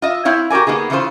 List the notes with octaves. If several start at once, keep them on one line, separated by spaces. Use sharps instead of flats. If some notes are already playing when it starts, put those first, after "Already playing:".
F4 D#5 E5
C4 E4 C#5 F5
F#4 G4 A#4 D5 G#5
A#3 B3 D#4 G#4
C#3 E3 A3 C#4 F4 C5